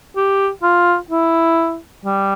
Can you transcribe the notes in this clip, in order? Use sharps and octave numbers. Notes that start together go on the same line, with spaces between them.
G4
F4
E4
G3